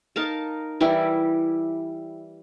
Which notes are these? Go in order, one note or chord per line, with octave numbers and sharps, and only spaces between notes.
D#4 A#4 F5 A5
E3 G3 E4 G4